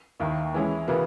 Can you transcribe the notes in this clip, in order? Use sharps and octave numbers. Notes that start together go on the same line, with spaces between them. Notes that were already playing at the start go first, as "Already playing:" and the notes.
D#2 D#3 A#3 E4
E3 G#3 C#4 E4
C#3 E3 B3 F#4 A#4